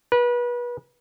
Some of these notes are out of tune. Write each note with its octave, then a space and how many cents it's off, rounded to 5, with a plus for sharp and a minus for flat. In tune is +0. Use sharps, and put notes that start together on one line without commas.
B4 -30